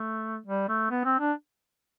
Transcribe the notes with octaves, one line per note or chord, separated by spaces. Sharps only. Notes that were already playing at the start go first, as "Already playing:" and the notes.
Already playing: A3
G3
A3
B3
C4
D4